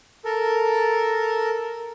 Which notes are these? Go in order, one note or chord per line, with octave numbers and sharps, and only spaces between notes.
A4 A#4